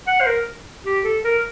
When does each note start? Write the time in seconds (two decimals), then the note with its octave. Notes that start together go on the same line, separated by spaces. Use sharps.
0.07 F#5
0.21 C5
0.26 A#4
0.85 G4
1.04 A4
1.24 A#4